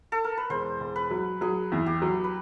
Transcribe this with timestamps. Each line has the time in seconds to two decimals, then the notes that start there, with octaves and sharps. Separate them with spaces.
0.12 A4
0.24 A#4
0.37 B4
0.49 E1 C5
0.80 E1
0.96 B4
1.10 F#3
1.41 F#3 G#4
1.72 E2
1.86 G4
2.02 F#3
2.24 B4